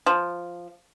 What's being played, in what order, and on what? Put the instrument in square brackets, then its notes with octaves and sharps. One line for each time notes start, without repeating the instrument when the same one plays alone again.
[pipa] F3